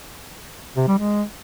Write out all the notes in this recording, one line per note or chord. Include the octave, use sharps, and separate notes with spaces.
C3
G3
G#3